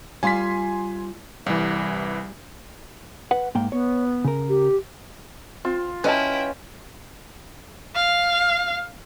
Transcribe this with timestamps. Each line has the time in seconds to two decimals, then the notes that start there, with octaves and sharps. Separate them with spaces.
0.23 G3 F4 G#5 C6 B6
1.46 C2 E3 G3
3.31 B4 F#5
3.55 G#2 A#3 G5
3.72 B3 C#5
4.25 C#3 A#4
4.49 G4
5.65 C4 F4
6.04 C#4 E4 B4 D#5 G5 A5
7.96 F5